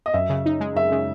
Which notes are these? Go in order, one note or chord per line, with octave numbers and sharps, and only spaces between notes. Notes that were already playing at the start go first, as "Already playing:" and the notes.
D#5
F#2 E5
C#3
D#4
G#3
F#2 E5
C#3